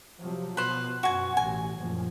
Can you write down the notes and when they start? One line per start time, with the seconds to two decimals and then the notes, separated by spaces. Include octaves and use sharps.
0.20 C3 F3 F#3
0.57 B2 B4 C5
1.03 F#2 B2 F#4 G#5
1.37 A1 G#5
1.79 F#1 A#2 F3